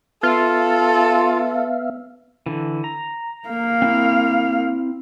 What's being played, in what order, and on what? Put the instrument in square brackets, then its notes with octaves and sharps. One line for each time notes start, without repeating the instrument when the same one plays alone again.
[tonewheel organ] B3 E5 F5 [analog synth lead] F4 [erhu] A4
[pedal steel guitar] D3 E3
A#5
[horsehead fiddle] A#3 F5
[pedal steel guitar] C4 E4